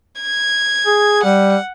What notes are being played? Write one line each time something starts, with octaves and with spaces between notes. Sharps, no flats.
G#6
G#4
G3 F#5